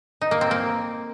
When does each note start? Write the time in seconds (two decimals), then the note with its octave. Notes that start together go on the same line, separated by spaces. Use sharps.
0.21 D#4
0.31 A#3
0.41 C4
0.51 A#3